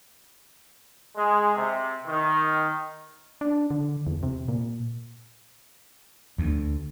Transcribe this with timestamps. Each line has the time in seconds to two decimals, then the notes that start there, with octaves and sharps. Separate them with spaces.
1.16 G#3
1.55 C3
2.07 D#3
3.41 D4
3.71 D3
4.07 E2
4.23 C3
4.48 A#2
6.38 D2